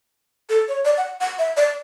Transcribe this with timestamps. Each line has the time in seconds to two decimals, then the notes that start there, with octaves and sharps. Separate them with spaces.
0.49 A4
0.68 C#5
0.85 D5
0.97 F#5
1.21 F#5
1.39 E5
1.57 D5